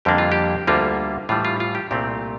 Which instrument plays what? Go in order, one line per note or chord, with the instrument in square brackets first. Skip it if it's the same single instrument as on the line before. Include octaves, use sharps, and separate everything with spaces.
[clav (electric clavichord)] F2 D3 G3 A#3 D4 G4
F4
G4
D2 D3 G3 A#3 F4
A2 E3 G3 F4
F4
F4
G4
C2 A#2 A3 C4 G4